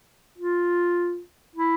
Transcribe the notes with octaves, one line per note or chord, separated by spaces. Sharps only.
F4
E4